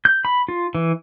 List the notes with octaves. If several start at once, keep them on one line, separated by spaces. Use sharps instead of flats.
G6
B5
F4
E3